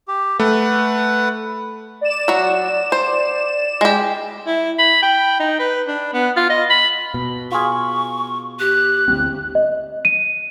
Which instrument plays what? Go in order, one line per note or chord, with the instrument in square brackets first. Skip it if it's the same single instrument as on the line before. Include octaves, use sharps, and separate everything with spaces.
[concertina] G4
[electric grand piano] A3 [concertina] B4 F#5
[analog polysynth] D5 E7
[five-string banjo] F#3 F#4
C5
G#3 G4
[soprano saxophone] E4
B5
G5
D#4
B4
D4
B3
F4
D#5
B5
[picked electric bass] B2
[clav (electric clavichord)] F4 G#4 [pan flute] C#6
[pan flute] G4 [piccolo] F#6
[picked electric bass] D2 A#3 C4
[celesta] D#5
D#7